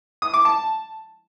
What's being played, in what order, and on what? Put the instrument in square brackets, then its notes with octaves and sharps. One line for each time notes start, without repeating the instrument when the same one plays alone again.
[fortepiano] D#6
D6
A5